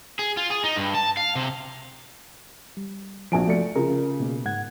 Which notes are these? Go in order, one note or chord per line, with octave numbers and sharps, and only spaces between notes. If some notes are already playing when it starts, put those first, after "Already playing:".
G#4
F4
G#4
D#4
G2
A5
F5
C3
G3
A#1 F3 F#4 G#5 D7
A3 D5 C#7
C#3 F4 A#4
B2 A#3
G#2 F#5 G#6